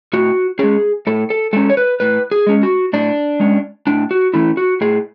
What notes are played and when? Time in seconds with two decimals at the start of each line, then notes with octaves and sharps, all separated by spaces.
0.13 A2 F#4
0.59 G#3 C#4 G#4
1.07 A2 A4
1.30 A4
1.53 G#3 C#4 A4
1.70 C#5
1.77 B4
2.00 A2 B4
2.31 G#4
2.47 G#3 C#4
2.63 F#4
2.93 A2 D4
3.40 G#3 C#4
3.87 A2 D4
4.11 F#4
4.34 E3 A3 C#4 E4
4.57 F#4
4.81 A2 G#4